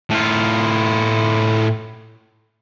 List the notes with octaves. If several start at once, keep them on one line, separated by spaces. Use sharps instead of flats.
A2 F4